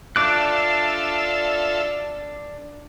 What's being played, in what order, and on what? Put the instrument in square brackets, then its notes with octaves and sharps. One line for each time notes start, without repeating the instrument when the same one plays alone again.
[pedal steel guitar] D4 D6 F#6 [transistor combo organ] F4 A4 E5